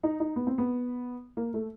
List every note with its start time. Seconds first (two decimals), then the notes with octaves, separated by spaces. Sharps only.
0.03 D#4
0.20 D#4
0.36 B3
0.47 C4
0.58 B3
1.37 A#3
1.54 A3